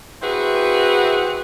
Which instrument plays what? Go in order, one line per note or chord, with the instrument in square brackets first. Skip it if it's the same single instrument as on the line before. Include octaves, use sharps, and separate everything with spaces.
[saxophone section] C4 E4 F#4 G#4 B4